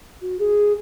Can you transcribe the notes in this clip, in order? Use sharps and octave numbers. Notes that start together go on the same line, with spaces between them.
F#4
G#4